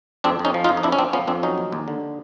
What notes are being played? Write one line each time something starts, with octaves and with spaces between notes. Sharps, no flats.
F2 C4 D4
F2
C#4 D#4
F3
D#4 F4
F2
D#4
F2 D4 E4
C#4
F2 C4 D4
F3 B3 C#4
F2 C4 D4
F#3 C#4 D#4
D#2
D#2
D3